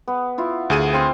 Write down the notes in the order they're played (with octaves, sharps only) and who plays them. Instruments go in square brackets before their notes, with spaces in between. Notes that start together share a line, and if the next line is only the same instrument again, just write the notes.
[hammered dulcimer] B3
E4 F4
[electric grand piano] D2 G#4 D#7
[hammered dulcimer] C4 F5 C6